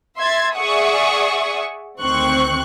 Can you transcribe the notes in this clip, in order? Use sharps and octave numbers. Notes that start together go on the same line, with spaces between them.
E5 C6 G#6 A6
G#4 D5 E5 F#5 C#6 D#6
D2 D#3 C4 C#6 F#6